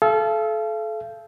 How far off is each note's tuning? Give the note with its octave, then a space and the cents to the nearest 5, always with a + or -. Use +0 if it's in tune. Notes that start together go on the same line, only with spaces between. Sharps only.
A4 -30 F5 -40